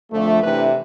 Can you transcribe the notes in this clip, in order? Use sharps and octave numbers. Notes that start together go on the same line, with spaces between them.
F2 D3 F3 A3
C3 E3 A3 D4 B4